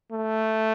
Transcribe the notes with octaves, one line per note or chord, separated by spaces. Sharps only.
A3